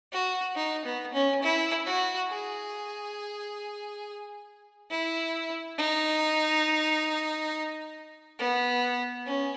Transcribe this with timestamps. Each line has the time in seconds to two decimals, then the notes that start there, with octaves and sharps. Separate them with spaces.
0.12 F#4
0.55 D#4
0.84 B3
1.13 C#4
1.42 E4
1.86 F#4
2.30 G#4
4.90 E4
5.78 D#4
8.39 B3
9.26 C#4